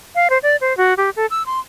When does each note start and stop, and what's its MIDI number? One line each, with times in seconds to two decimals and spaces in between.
0.15 0.28 77
0.30 0.38 72
0.43 0.56 74
0.61 0.75 72
0.77 0.94 66
0.97 1.10 67
1.16 1.26 69
1.31 1.43 88
1.46 1.59 84